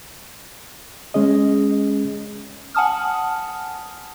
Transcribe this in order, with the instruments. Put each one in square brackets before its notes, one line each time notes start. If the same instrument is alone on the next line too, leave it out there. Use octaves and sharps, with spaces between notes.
[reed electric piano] G#3 C#4 G#4 D#5
[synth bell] F#5 G#5 A5 D#6 F6